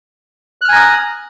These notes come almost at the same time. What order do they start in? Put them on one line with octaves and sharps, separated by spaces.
F#6 F6 G#5 A#5 D#6